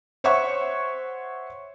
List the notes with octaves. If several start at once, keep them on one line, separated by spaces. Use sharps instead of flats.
C5 C#5 E5 F#5 C#6